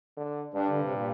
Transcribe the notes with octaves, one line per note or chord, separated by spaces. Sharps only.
D3
G2 D4
D3
C3
A#2